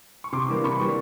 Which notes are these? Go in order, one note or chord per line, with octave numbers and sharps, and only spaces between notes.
C#6
C3 C6 D6
E3 G3 A#3
C3 B5 C#6
E3 G3 A#3